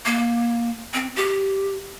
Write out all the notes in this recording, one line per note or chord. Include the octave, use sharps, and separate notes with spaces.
A#3
C4
G4